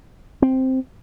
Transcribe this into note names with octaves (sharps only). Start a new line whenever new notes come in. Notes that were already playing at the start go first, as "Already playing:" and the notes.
C4